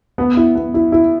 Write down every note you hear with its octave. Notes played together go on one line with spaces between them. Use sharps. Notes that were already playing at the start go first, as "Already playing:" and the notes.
B3
E4
B3
E4
E4